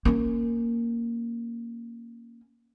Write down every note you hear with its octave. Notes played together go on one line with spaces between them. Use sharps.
A#3 C#4